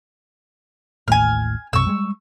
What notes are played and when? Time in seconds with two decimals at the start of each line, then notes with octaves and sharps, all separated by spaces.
1.08 A1 D#2 A2 G#5 F6
1.73 B1 F#2 C3 C#6 E6
1.87 G3 G#3